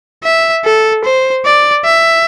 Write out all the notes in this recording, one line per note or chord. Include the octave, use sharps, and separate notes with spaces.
E5
A4
C5
D5
E5